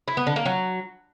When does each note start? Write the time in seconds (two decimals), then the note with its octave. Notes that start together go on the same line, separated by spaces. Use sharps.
0.08 E4
0.17 B3
0.27 D3
0.36 A#3
0.45 F#3